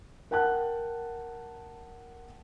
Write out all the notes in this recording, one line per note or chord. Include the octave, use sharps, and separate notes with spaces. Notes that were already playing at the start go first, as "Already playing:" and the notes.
A#4 F#5 G5 A5 F#6